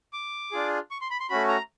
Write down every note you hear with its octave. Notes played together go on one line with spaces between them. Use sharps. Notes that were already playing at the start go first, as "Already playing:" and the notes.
D6
D4 F4 G#4
C#6
C6
B5
C6
A3 C#4 F#4 B5
A#5